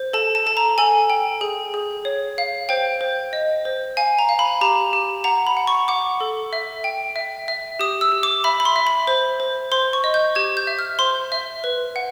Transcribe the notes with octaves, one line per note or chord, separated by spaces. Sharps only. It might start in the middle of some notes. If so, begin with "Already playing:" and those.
Already playing: C5
A4 A5
A5
A4 A5
A#5
A4 G#5
G5
G#4
G#4
C#5
F5
C5 G5
C5
D#5
C5
F5 G#5
A#5
F5
B5
G4 A#5
G4
F#5 A#5
B5
F#5
C#6
F#5 D6
A4
E5
G5
E5
E5
G4 D#6
E6
G4
D6
E5 B5
B5
C6
E5
B5
C5
C5
C5 C6
C#6
D#5
G6
G4 G#6
G6
E5
F6
C5 C6
E5
B4
F#5